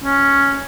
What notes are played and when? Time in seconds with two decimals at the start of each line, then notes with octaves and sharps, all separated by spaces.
0.04 C#4